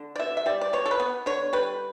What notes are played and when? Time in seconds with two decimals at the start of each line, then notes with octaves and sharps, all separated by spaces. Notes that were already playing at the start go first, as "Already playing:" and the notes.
Already playing: D3
0.16 D5
0.19 B2 E5
0.37 E5
0.46 G3 D5
0.61 D5
0.73 B2 C#5
0.86 A4
0.91 B4
1.00 B3
1.26 D3 C#5
1.53 G3 B4